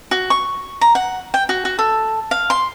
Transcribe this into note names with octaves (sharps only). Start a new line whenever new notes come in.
F#4
C#6
A#5
F#5
G5
F#4
F#4
A4
F5
C6